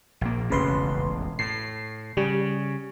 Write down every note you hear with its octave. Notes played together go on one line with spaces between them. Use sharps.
A#1 A#3
E1 A1 F2 C#3 B4 C6
A2 C7
C#3 G3